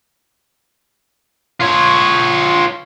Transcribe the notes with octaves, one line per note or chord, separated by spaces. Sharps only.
F4 C#5